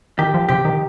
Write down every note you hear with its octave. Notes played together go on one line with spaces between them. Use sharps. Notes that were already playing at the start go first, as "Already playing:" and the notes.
D#3 G4
F3
C3 G4
D#3